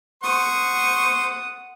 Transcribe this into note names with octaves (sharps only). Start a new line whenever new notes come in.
C5 F#5 C#6 D#6